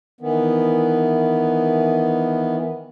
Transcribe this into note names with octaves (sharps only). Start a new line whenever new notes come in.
D#3 E3 B3